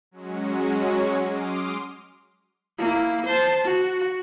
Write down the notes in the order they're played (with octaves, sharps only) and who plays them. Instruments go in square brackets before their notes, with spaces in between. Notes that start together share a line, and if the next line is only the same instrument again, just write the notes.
[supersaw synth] F#3 G#3 C#4 F#4
C6 D6 D#6 F6
[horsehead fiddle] A#3 E4
C5 A5
F#4